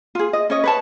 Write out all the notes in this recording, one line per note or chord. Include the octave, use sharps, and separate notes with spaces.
F4 G#4
D#5
C#4 C#5 D#5
B4 C#5 A5